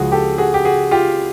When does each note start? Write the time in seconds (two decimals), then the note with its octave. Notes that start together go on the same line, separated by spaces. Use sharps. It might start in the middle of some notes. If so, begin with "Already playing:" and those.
Already playing: C#2 C#3 F3 F#4 G#4
0.12 G4 A4
0.38 F#4 G#4
0.54 G4
0.65 F#4 G#4
0.91 F4 G4